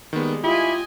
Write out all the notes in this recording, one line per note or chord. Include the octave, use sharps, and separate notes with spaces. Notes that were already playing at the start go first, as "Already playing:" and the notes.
D#3 G3 G#3 A#3 B3
E4 F4 G4 D#5 G#5